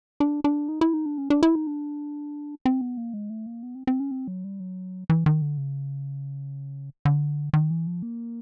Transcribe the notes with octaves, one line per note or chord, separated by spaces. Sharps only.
D4
D4
D#4
E4
D#4
D4
C#4
D4
E4
D#4
D4
C4
B3
A#3
G#3
A3
A#3
B3
C4
C4
C#4
C4
F#3
G3
F#3
E3
D#3
D3
C#3
D3
D#3
E3
F3
A#3